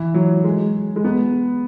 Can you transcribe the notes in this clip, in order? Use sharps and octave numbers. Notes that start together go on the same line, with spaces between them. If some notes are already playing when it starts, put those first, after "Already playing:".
Already playing: E3
F#3
G#3
G#3
B3